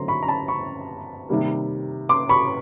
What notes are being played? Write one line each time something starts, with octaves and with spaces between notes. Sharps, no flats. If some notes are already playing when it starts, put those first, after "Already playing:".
Already playing: D3 F#3 A3 C4 A#5 C6
B5 C#6
A#5
A5 B5
B5 C#6
C3 D#3 G3 A#3
C6 D6
B5 C#6